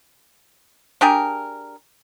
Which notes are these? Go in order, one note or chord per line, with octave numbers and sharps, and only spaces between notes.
D4 G4 G#4 A#4